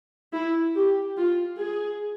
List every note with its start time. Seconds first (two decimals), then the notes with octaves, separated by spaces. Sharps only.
0.33 E4
0.75 G4
1.17 F4
1.59 G#4